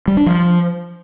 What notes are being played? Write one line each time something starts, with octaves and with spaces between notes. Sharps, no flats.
G3
D4
F3